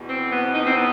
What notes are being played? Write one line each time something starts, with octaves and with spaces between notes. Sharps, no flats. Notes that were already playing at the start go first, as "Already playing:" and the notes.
Already playing: E2 B2
C4
B3
D#4
C4
B3